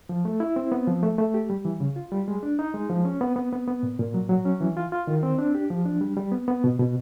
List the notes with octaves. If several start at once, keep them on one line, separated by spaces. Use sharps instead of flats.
F3
A3
E4
C4
B3
F3
A3
A3
G4
G3
E3
C#3
F4
G3
G#3
D4
D#4
G#3
F3
C#4
B3
B3
B3
B3
A#2
A#2
F#3
F#3
C#4
E3
F4
F4
D#3
C4
D4
G4
F3
D4
G3
G3
B3
B3
B2
B2